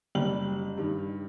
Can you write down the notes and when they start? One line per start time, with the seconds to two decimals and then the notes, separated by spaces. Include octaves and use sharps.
0.15 F#1 G3 F#7
0.78 G2 D#3